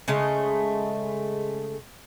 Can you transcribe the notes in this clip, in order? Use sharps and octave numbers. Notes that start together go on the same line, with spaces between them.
C#3 G#3 A3 D#5